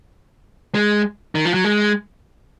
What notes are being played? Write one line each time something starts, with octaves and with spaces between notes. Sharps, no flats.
G#3
D#3
F3
F#3
G#3